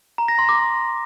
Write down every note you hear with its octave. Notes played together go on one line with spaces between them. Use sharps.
A#5
A#6
C6
D6